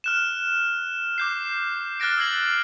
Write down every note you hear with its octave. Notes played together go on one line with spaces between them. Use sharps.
F6 F#6 E7
D6 G6 C7
F6 F#6 A6 A#6 D7
E6 G#6 C7 F#7